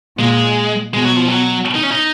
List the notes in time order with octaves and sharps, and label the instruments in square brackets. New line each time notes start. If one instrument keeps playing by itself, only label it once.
[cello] A#2 [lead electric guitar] G#3
[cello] B2 [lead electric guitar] G#3
[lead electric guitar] F#3
F3
F#3
D#4
C#4
D#4